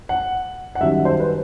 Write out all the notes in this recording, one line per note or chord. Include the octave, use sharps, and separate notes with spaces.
F#5
F#5
F#2 D#3 G3 E5
C5
B4